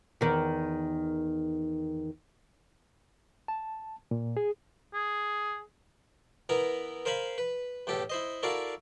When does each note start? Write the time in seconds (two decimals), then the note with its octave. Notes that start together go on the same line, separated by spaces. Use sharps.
0.21 E2 D#3
3.48 A5
4.11 A#2
4.37 G#4
4.94 G#4
6.49 E3 B3 E4 A#4 A#5
7.05 A#4 C5 F5 G#5 B5
7.38 B4
7.87 E2 A2 G4 A4
8.10 E4 C5 D#5
8.43 E4 F#4 A4 A#4 D5 F5